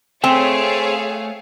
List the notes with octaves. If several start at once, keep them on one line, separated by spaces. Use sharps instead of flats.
A3 C4 G#4 C#5 F5 G5